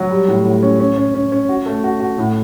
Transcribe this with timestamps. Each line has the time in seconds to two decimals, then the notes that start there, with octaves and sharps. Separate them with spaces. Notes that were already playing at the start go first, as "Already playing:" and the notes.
Already playing: F#3
0.11 G3
0.28 A2
0.45 A2
0.63 C#4
0.80 C#4
0.98 C#4
1.14 C#4
1.32 C#4
1.49 F#4
1.66 A3
1.84 F#4
2.00 F#4
2.18 A2